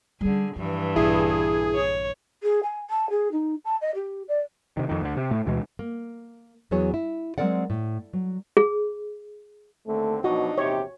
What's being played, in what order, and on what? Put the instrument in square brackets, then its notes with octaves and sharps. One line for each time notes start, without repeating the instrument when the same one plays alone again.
[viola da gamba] D3 G#4 [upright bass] G3 C#4
[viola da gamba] G2 E3 [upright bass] F3
[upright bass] A#1 [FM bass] E4 [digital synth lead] G#4
[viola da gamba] C#5
[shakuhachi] G#4
G#5
A5
G#4
D#4
A5
D#5
G4
D5
[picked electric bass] C3 D#3
F2 D#3
D2 D3
C3
A2 A3
D2 B2 E3 G#3
[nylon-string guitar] A#3
E2 E3 F#3 B3 G#4 C#5
E4
F#3 G#3 C4 A#4 D5 F#5
A2
F#3
[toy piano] G#4
[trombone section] D#2 D3 C4 [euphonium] A3
[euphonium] B2 [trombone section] F3 F#3 D4 [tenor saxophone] D#4 [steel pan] F#4
[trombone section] A#1 E2 G4 [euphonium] C3 [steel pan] C#5